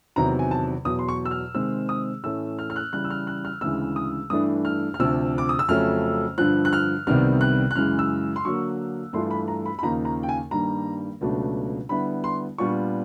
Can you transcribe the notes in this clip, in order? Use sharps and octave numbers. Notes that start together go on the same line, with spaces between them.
E2 C3 D#3 F#3 A#5
G#5
A5
E2 B2 F#3 D#6
C6
C#6
E6
F6
C3 D#3 G#3 C4 E6
D#6
A2 E3 A3 C#4 E6
F6
F6
F#6
C#3 E3 G3 F#6
E6
F6
F#6
F6
D2 C#3 E3 G#3 E6
D#6
G2 E3 A3 D4 D#6
F6
F6
D2 C3 F3 E6
D6
D#6
E6
F2 C#3 F#3 A3 C#4 F6
G2 D3 F3 F#6
F#6
F6
C2 C3 D#3 G3 B3 F6
F#6
F#6
F#2 C#3 E3 G#3 F6
E6
C6
D3 F#3 A#3 C#6
G2 E3 A3 D4 F4 C6
B5
A#5
B5
B5
D#2 C#3 F3 A#3 D#4 A#5
A#5
G5
G#5
G2 D#3 G3 A#3 D4 A#5
C#2 B2 F#3 A3 D4
D3 G3 B3 E4 B5
C6
A#2 G3 B3 D4 F4 C#6